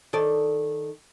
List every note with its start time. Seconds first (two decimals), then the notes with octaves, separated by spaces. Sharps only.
0.13 D#3 A4 D5